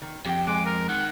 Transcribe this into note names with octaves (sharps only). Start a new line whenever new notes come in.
D#3
F2 G4 G5
G#3 G#5 D6
A#4
D#3 F#5